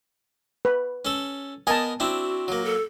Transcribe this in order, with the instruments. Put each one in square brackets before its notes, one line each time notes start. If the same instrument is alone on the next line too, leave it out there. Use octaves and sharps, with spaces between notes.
[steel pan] B4
[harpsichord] C#4 A4
[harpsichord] B3 A#4 D#5 [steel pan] G#5 A5
[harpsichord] C4 D4 E4 [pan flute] F#4
[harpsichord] F#3 A#3
[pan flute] A4